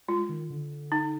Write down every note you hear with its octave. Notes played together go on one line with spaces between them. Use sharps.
G#3 F4
D#3
D3
D#4